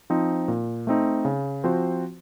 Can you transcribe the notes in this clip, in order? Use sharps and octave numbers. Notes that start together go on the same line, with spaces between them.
F3 C4 D#4
A#2
A3 C4 D#4
C#3
F3 C4 F#4 C5